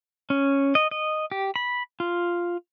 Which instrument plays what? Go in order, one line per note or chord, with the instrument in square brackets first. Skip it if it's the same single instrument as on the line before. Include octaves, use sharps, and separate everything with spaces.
[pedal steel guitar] C#4
D#5
D#5
G4
B5
F4